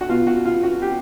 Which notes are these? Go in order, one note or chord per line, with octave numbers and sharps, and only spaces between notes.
F#4
B2 F4
F#4
F4
F#4
G4